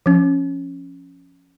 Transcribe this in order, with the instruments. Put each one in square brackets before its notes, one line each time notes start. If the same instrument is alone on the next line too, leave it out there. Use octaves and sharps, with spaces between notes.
[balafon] F3 C#4